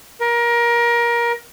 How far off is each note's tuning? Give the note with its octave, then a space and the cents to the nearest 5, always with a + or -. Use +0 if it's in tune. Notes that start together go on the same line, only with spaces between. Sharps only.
A#4 +25